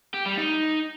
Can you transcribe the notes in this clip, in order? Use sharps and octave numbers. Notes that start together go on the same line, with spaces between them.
G4
G3
D#4